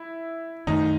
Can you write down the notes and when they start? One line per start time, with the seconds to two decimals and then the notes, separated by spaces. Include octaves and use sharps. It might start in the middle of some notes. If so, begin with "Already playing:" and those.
Already playing: E4
0.67 F#2 D#3 A3 D#4